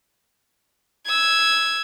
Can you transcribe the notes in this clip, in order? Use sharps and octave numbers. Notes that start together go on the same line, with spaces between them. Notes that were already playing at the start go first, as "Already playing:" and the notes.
E6 G#6